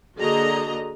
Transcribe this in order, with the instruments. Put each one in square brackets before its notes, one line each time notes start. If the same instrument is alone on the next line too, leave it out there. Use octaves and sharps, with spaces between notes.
[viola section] D3 A#3 F#4 G#4 D#5 A#5